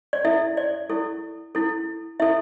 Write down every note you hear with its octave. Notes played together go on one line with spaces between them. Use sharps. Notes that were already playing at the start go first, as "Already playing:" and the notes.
D5
E4 A4 E5
D5
E4 A4
E4 A4
E4 A4 E5